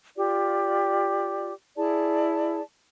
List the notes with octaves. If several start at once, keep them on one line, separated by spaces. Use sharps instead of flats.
F4 G4 D5
E4 G#4 D5 A5